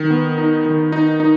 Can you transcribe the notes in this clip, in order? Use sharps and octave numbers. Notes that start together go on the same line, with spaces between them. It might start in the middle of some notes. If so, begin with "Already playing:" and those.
Already playing: D#3
B3
D#4
D#3
D#4
D#4